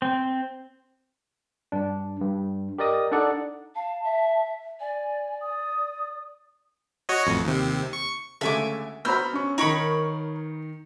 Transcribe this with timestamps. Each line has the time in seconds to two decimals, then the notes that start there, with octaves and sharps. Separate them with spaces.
0.02 C4
1.72 G2 D4
2.21 G2
2.78 G4 A#4 D5 D#5 D#6
3.12 D4 D#4 A4 D5 F#5
3.75 F5 A5
4.03 E5
4.80 D5 G#5
5.40 D#6
7.09 F#4 C#5 D#5
7.26 A1 F2
7.44 D#2 C3
7.93 C#6
8.41 D2 C#3 G#3 A4 E5 G#5 D6
9.05 B3 F#4 C5 A#5 B5 E6 F6 G6
9.33 C#4 C#6
9.58 D#3 D#4 A#4 C#5 B5